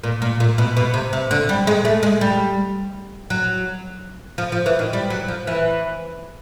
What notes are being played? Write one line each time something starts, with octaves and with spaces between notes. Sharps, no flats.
A#2
A#2
A#2
B2
B2
C3
C3
D3
G3
G#3
A3
G#3
G3
F#3
F3
F3
E3
D#3
G3
F#3
F3
E3